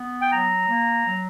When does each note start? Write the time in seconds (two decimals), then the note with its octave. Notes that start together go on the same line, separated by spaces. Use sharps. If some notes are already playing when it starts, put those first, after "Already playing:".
Already playing: B3
0.21 G5
0.31 F#3 A#5
0.69 A#3
1.07 F#3